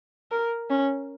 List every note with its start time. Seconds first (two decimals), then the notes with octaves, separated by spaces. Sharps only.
0.31 A#4
0.70 C#4